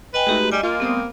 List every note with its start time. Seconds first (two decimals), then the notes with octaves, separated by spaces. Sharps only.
0.14 B4 D#5 G5 G#5
0.27 G#3 A3 D#4 F#4 G4
0.52 G3 D#5 G#5
0.63 A#3 F4
0.80 G3 A3 B3 C4 D#6